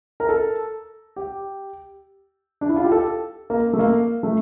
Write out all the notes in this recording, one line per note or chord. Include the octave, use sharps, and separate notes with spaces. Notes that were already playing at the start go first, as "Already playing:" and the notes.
A#4
A4
G4
D4
E4
F4
G4
A4
A#3
A3
A#3
A3